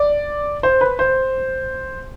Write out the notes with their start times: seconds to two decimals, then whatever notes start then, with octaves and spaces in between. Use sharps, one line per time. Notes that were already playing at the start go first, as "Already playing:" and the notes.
Already playing: D5
0.63 C5
0.81 B4
0.99 C5